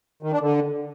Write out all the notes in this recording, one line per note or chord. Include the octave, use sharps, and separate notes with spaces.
D#3
D4
D3